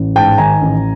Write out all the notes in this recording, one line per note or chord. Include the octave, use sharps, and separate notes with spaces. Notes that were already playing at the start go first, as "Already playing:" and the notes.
Already playing: A1
G#2 G5 A5
D#3 G#5 A#5
A1